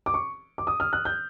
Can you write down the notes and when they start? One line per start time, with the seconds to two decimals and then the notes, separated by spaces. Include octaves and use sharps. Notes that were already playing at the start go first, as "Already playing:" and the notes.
0.06 D6
0.14 C#6
0.58 D6
0.67 D#6
0.80 F6
0.93 F#6
1.05 G6